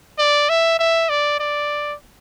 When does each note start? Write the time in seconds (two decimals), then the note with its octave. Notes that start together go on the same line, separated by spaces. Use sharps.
0.19 D5
0.49 E5
0.79 E5
1.10 D5
1.40 D5